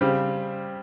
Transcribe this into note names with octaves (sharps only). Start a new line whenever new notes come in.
C#3 G3 C4 G4